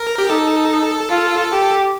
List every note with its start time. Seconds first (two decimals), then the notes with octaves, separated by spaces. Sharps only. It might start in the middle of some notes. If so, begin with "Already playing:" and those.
Already playing: A#4
0.18 G4
0.29 D#4 A4
1.10 F4
1.51 G4